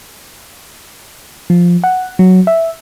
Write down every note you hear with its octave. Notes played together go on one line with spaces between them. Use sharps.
F3
F#5
F#3
E5